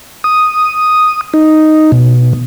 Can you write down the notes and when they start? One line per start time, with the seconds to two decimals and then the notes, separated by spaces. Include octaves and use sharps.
0.24 D#6
1.34 D#4
1.92 B2